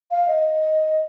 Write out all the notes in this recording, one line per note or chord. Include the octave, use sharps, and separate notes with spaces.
F5
D#5